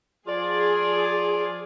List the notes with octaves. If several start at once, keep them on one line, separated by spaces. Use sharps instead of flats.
F3 F4 G#4 D5